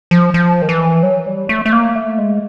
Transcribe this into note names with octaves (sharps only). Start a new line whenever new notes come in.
F3
F3
D#3
E3
F#3
G3
A3
A3
A#3
A3
G#3